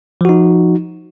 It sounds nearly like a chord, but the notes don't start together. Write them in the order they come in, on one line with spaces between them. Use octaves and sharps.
F3 F#4 D#4